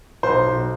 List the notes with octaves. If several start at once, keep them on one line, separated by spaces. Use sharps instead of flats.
B1 C5
B1